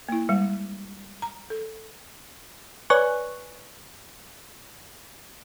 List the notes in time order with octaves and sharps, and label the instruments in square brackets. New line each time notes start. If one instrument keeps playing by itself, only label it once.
[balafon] A#3 E4
G3 G#3
A#5
A4
[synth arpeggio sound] B4 C#5 D5 G#5 C#6 F#6